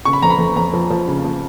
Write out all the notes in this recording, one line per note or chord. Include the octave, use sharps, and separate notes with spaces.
C#3 C#6
B5
F2 A#5
B5
F2
F2 A#5
F3
F3
C#3
F3